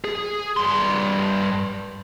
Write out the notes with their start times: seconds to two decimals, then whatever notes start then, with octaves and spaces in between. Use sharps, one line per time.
0.04 G#4
0.57 G2 C6